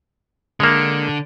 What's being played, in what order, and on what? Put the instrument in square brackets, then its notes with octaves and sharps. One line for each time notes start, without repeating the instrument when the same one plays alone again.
[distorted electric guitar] D3 [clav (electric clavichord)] G#3 A#3